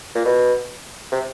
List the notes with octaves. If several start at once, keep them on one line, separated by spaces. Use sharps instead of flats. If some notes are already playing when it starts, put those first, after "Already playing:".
A#2
B2
C3